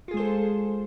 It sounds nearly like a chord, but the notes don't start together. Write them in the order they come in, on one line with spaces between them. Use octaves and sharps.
F4 G#4 G#3 C5 A4